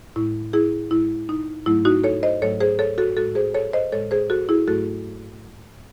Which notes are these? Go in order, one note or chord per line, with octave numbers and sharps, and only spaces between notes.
A2 G#3 E4
E4 G#4
A2 G#3 E4
D#4
G#2 F#3 A3 E4
D#4 F#4
A4 C#5
C5 D#5
G#2 F#3 A3 A4 C#5
G#4 C5
A4 C#5
F#4 A4
A2 G#3 F#4 A4
G#4 C5
A4 C#5
C5 D#5
A2 G#3 A4 C#5
G#4 C5
F#4 A4
E4 G#4
G#2 F#3 A3 F#4 A4